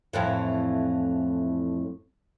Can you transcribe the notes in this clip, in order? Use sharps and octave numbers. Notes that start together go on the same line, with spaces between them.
F2 A2 E3